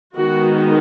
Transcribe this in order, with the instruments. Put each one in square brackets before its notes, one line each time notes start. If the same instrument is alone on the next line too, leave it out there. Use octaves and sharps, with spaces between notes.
[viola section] D#3 G#3 B3 D#4 F#4